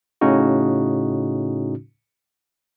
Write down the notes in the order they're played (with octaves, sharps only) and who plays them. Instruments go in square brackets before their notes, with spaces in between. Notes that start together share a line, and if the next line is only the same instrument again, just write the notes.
[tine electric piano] A2 C#3 C#4 D#4 F#4